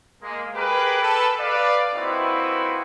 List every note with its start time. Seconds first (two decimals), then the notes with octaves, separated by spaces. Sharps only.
0.22 G#3 A#3
0.55 G4 G#4 A#4 B4
1.02 A4 B4
1.39 B4 D5 F5
1.94 A#3 C4 D#4 E4 F#4 B4